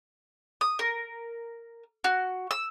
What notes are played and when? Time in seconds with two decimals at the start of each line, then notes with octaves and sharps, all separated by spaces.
0.61 D#6
0.79 A#4
2.04 F#4
2.51 E6